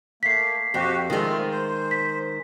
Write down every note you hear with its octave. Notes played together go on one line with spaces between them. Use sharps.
A3 A#3 B6 C7
F2 F#4 G4
D#3 G#3 A3 C4 F4
C5
B6